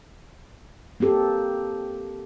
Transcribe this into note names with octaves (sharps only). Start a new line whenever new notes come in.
A#3 C4 G4 A4